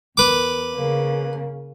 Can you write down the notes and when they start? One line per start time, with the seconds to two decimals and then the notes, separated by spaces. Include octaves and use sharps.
0.17 E2 A#4 B4 D6
0.74 C#3 A#3